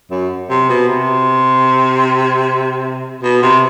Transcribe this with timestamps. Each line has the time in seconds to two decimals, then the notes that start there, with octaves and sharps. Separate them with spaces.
0.11 F#2
0.50 C3
0.69 B2
0.89 C3
3.23 B2
3.42 C3